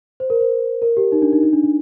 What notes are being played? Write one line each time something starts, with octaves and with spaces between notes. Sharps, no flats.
C5
A#4
C5
A#4
G4
D#4
D4
D#4
D#4
D4
D4